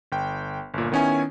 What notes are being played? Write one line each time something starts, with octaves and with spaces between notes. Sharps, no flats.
G1 G5
G1 A#2
D#3 B3 C#4 E4 G#5